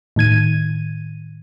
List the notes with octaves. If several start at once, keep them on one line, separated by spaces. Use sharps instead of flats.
A2 D#3 G#6 D#7